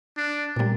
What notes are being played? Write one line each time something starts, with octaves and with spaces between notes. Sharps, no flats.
D4
A#2 G3 A#3